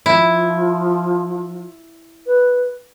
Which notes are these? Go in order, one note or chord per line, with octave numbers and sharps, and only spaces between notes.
F3 E4
B4